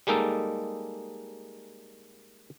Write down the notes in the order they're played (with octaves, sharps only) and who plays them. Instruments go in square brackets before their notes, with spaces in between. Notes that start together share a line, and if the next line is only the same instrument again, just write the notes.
[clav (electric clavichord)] G3 G#3 A#3 D#4 A4